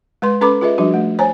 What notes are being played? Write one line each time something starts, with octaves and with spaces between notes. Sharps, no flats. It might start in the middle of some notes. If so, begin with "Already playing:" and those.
G#3 B4 C6
C#4 A4 B4 A#5 B5 D6
F4 G#4 B4 D#5 E5
F3 G3 D4 F#4
A3
C5 C#5 G#5 A#5